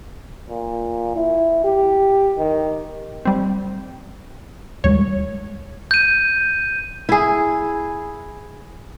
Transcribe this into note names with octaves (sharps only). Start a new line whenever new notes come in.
A#2
E4
G4
D#3
G3 C4
D#2 G3 G#3 C#5
G6 D#7
E4 G#4